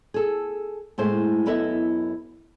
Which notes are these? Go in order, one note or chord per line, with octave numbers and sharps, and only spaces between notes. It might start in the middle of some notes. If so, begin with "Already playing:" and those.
G#4 A4
A2 G#3 A3 C5
F#2 B3 E4 A4 D#5 E5